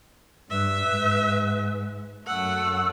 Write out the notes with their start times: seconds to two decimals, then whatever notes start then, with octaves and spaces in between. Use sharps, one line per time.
0.50 G2 B4 E5
0.89 G#2
2.27 F#2 A3 F#5 E6